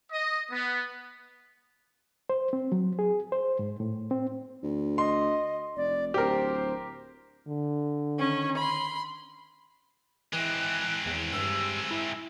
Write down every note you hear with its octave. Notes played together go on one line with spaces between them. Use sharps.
D#5
B3
C5
C4
F#3
G#4
C5
G#2
A2
C4
D2
D#5 C6
F1 D5
D1 G4 A#4 C5
D3
D#3 C#4
B5 C6
E3 G#3 C4 F#6
E2
G2 E6
E4